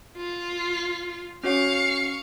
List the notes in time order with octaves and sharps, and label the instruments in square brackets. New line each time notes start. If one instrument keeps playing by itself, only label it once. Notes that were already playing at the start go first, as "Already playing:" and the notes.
[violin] F4
[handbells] C#4 F#4 C#5 [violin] F5 C#6